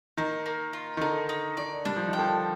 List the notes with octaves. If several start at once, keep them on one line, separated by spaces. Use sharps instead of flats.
D#3 A#3
A#3
F4
D#3
D3 D#4
D#4
D#3 D5
G3 D4
F3
D#3
G5
D3 F3